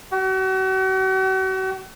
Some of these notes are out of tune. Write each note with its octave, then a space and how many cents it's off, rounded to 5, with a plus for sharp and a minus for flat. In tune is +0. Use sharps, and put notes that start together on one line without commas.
F#4 +40